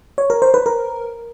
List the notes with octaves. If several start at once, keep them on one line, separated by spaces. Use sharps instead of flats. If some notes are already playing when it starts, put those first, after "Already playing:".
C#5
A#4
C5
B4
A#4